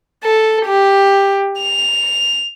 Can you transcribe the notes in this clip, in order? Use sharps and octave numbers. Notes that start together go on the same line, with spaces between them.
A4
G4
F7